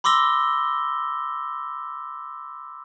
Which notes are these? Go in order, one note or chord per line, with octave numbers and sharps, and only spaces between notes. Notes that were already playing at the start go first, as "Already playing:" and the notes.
B5 C6 D6 E6 A#6 G7